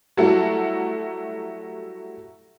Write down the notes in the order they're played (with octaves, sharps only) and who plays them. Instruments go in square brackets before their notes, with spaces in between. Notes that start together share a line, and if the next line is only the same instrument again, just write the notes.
[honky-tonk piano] F#3 G3 A3 E4 F#4